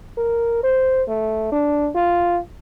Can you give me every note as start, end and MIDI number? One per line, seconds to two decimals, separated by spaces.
0.17 0.60 70
0.63 1.03 72
1.08 1.50 57
1.52 1.89 62
1.95 2.38 65